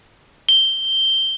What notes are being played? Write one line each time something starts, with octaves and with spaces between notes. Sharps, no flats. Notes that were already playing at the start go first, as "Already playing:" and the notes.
G7